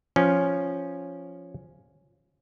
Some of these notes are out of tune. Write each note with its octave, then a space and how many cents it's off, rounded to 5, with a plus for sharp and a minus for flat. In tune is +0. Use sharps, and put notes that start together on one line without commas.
F3 +0 C#4 +0